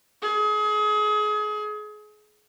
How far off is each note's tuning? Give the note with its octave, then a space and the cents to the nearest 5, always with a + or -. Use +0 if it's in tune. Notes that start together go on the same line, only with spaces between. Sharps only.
G#4 +30